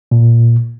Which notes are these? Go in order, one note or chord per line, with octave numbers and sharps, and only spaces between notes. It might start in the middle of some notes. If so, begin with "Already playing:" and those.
A#2